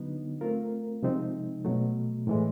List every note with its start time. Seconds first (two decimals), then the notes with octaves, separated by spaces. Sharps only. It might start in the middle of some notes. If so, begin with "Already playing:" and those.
Already playing: D3 F#3 B3 D#4
0.41 A3 C4 F4 A#4
1.03 C3 F3 G#3 C4 D#4
1.65 B2 F#3 A3
2.27 A2 E3 G#3